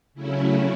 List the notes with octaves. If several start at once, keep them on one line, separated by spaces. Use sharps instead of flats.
C#3 F#3 A3 C#4 E4